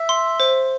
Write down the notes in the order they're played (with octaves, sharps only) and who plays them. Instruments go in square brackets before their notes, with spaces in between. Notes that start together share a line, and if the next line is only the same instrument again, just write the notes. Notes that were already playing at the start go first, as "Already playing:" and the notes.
Already playing: [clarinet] E5
[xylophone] C6
C5